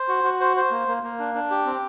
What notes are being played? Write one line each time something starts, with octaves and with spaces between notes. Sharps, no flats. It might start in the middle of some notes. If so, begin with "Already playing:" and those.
Already playing: C5
F#4
F#4
C5
C5
A#3
A#3
A#3
D4
D4
G4
C4